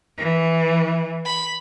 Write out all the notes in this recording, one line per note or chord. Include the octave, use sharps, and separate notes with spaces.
E3
B5